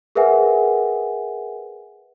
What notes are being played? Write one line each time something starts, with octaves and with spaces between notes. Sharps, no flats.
G#4 A#4 B4 E5 F#5 G#5